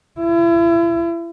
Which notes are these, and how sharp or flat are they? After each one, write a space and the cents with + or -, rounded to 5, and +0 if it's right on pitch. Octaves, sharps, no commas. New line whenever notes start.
E4 +35